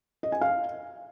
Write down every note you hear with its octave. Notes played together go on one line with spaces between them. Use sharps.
D#5
G#5
F5